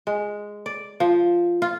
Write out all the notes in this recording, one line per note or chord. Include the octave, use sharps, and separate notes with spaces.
G#3
D5
F3
F4